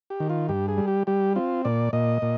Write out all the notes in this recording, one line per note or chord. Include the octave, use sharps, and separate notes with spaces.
G4
D#3
F4
G2 G4
G#4
G3
G4
G3 G4
C4 F4
A#2 D5
A#2 D#5
A#2